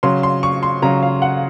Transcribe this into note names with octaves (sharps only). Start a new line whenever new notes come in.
C#3 F#3 C6
C6
C#6
C6
C#3 F#3 A#5
F5
F#5